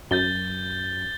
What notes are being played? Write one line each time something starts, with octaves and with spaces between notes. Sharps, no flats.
F#2 G6 A6 G7